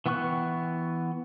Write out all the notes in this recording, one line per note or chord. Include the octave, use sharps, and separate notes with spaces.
E3 B3 G5 C#6 F#6